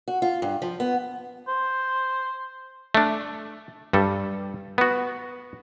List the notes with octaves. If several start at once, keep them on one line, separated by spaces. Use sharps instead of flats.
F#4
F4
G2
F3
B3
C5
A3 D4
G2 G3 A4
B3 F#4